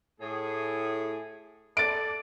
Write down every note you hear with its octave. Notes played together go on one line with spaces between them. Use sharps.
A2 G#4
A4 D5 A6 D7